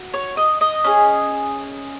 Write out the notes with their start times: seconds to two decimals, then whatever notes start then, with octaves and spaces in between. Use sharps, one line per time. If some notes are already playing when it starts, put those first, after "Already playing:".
Already playing: F#4
0.14 C#5
0.37 D#5
0.61 D#5
0.84 C#4 G#4